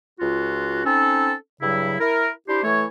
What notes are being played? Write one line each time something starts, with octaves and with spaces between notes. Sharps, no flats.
C#2 F4 F#4
C4 C#4 D#4 A4
G2 C#3 F#3 E4
E4 A#4
D4 E4 G4 C5
E3 A3 A4 C#5